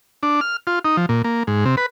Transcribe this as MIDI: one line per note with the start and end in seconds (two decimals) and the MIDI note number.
0.23 0.40 62
0.41 0.57 89
0.67 0.79 65
0.85 0.97 63
0.97 1.06 53
1.09 1.22 46
1.24 1.43 58
1.47 1.65 44
1.65 1.75 48
1.77 1.86 71